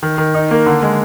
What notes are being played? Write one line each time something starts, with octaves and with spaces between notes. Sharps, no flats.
D#3
D#3
D#4
A#3
D3
G#3